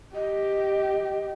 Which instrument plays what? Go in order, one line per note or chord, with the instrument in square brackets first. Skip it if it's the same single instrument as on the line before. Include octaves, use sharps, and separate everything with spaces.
[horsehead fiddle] G4 [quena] D#5